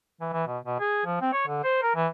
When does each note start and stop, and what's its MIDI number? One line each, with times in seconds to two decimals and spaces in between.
0.21 0.31 52
0.33 0.45 52
0.47 0.58 47
0.65 0.79 47
0.80 1.03 68
1.06 1.19 53
1.21 1.31 60
1.33 1.43 73
1.47 1.63 50
1.64 1.79 72
1.82 1.94 70
1.95 2.07 52